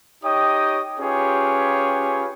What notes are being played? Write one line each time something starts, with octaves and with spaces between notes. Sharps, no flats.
D#4 G4 C#5 D#5 G5 D#6
C#4 F4 G4 G#4 B4 C#5